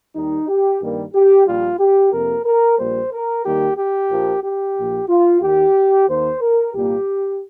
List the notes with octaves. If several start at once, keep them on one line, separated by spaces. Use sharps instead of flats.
D#2 D#3 G3 D#4
G4
G2 D#3 G3 A#3
G4
A#1 A#2 G3 A#3 F4
G4
F2 C3 F3 A#3 A#4
A#4
A#1 A#2 G3 A#3 C5
A#4
D#2 D#3 G3 A#3 G4
G4
A#1 A#2 F3 A#3
G4
A#1 A#2 F3
F4
D#2 D#3 A#3 G4
D#2 D#3 A#3 C5
A#4
C2 A#2 G3 A#3 G4